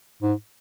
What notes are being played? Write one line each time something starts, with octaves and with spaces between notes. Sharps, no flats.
G#2